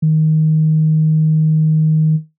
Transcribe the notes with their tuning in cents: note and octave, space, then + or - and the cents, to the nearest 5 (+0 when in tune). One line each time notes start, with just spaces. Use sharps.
D#3 +10